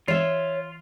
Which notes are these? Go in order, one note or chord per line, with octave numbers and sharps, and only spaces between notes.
E3 F4 C#5 E5